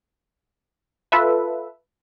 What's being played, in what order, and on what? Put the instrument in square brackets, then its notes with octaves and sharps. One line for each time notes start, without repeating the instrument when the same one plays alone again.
[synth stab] F4 A4 B4 E5